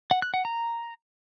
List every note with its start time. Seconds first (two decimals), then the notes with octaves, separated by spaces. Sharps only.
0.11 F#5
0.22 F#6
0.34 F#5
0.45 A#5